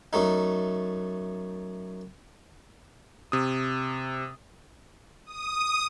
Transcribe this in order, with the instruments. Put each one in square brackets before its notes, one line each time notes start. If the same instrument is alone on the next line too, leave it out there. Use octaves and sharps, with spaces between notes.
[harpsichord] F#2 A3 D#4
[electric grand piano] C3 D#6
[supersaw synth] D#6